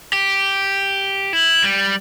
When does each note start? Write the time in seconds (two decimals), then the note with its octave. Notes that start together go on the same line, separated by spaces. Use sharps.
0.13 G4
1.33 E4
1.64 G3